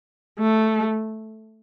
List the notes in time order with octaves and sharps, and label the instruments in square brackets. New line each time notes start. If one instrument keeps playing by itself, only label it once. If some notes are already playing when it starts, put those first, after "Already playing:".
[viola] A3